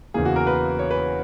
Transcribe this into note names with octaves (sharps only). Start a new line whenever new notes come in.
E2 C#3 E3 A#3 G#4
F#4
A#4
B4
C#5
B4